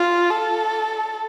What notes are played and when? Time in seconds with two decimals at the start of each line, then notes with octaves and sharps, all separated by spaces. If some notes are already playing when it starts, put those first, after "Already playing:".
Already playing: F4
0.30 A4